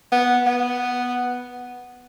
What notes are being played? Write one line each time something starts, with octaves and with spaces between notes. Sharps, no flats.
B3
B3